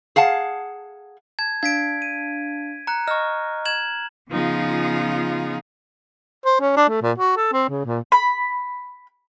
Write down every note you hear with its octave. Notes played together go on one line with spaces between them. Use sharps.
G#4 F5 F#5 A5
A5 G#6
D4 F5 G#6 B6 D7
D#7
A#5 F#6 C#7
D#5 C#6 F6
G#6 E7 F#7
C#3 F3 B3 D#4 F4 G#4
C5
C#4
D4
A3
A#2
F#4
A4
C4
C#3
A#2
B5